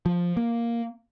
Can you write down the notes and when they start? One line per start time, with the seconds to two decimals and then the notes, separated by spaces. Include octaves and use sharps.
0.06 F3
0.37 A#3